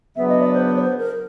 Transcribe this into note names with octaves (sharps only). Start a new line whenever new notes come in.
C#3 F#3 B3 D4 E5
D#5
D5
C5
B4
C#5
C5
A#4